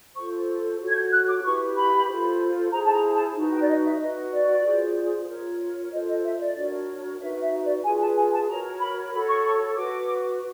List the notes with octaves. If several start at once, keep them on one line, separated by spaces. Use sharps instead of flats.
F4 A4 C5 C#6
F#4 A4 C#5
G#6
G6
F#6
D6
E4 G4 B4 C#6
B5
F4 A4 C5
E4 G#4 C5 A#5
A5
A#5
A5
D#4 F#4 B4
G5
D5
D#5
E5
F#4 B4 D#5
D5
F4 G#4 C5
F4 A#4 C#5
F4 A4 C5 D#5
D#5
E5
D5
D4 F#4 A#4 C#5
D#4 F#4 B4 E5
E5
D5
F4 G#4 B4 G#5
A5
G#5
A5
F#4 A#4 C#5 A#5
B5
F#4 A4 C#5 B5
C#6
C#6
F#4 B4 D6